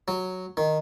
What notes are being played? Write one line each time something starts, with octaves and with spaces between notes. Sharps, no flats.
F#3
D#3